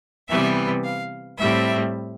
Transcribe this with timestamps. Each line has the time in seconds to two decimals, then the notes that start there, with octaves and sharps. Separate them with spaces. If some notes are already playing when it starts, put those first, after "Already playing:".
0.28 C3 E3 G3 B3 E5
0.84 F5
1.38 A2 G3 C4 E5